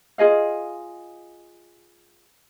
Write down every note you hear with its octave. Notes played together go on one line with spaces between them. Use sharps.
F4 G#4 D#5 F5